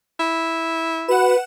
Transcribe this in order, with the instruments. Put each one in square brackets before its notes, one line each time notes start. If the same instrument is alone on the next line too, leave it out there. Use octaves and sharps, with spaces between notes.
[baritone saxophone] E4
[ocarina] F#4 [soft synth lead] B4 [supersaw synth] F#5 E7